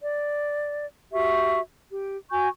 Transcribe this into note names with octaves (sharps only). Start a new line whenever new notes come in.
D5
F#4 G4 E5 C#6
G4
F#4 G#5 C#6 G6